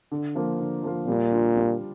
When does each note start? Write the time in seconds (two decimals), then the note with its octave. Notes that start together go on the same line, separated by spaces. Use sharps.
0.11 D3
0.35 F3 A#3 F4
0.60 D3
0.83 F3 A#3 F4
1.08 A#2 G3
1.32 D4 F4
1.57 G3